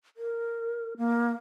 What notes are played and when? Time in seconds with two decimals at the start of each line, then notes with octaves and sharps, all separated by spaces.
0.17 A#4
0.98 A#3